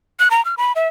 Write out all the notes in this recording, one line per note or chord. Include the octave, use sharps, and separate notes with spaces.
F#6
A#5
F6
B5
E5